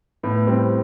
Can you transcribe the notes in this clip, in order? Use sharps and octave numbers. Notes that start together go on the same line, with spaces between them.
A2 B3
G3 C4